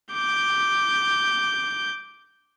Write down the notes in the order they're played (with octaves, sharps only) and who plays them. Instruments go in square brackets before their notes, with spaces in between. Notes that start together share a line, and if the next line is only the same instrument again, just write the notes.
[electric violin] D6 G6